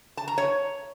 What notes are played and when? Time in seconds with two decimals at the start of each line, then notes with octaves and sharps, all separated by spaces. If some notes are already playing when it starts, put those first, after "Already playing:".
0.17 A5
0.28 A#5
0.38 C#5